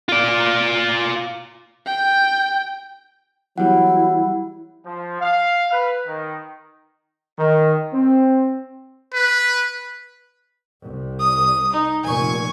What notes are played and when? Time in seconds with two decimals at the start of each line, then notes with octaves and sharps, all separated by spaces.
0.09 F4 D5
1.86 G5
3.58 E2 F#3 G3 E4 F#5
4.85 F3
5.21 F5
5.72 B4
6.06 D#3
7.38 D#3
7.93 C4
9.13 B4
10.82 C2
11.19 D#6
11.73 D#4
12.04 F1 A#2 G#5 C#6